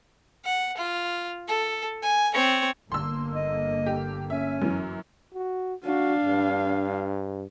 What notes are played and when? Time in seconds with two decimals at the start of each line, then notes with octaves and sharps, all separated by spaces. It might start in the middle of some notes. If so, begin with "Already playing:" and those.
0.45 F#5
0.77 F4
1.48 A4
2.02 G#5
2.33 C4 C#5
2.92 G1 D3 A#3 C6 E6
3.34 D#5
3.86 G4
4.30 C#4 E5
4.62 F#2 E3
5.34 F#4
5.84 D4 F#4 F5
6.25 G2